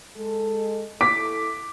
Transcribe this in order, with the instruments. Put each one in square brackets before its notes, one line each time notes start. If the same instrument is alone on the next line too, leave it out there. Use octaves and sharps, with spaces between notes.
[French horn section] G#3 A4
[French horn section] E4 A4 [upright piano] D6 B6